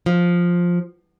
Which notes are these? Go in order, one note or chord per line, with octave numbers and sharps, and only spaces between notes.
F3